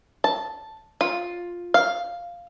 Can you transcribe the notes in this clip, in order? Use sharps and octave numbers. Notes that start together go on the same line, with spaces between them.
A5
F4
F5